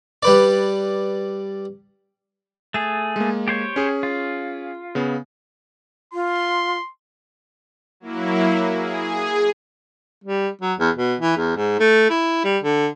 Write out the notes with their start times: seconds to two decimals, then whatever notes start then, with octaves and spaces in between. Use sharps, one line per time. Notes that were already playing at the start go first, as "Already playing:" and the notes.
0.23 G3 B4 D5
2.74 A3 G#4 A6
3.16 G#3 A#3
3.48 G4 C5 C#5
3.76 C#4 G#4
4.03 F4
4.95 C#3 B3
6.13 F4 C6
8.00 F#3 A#3 E4
8.73 G#4
10.24 G3
10.61 F#3
10.79 E2
10.96 B2
11.20 E3
11.37 E2
11.56 G#2
11.80 A3
12.10 E4
12.45 G3
12.63 D3